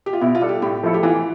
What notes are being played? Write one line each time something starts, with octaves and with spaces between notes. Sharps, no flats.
G4
F4
B2 E4
F4
G3 D4 A4
G4
A2 G4
F3 A3 E4 A4
G4
E3 F4